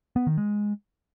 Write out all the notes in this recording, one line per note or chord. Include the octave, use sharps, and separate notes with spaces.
B3
D#3
G#3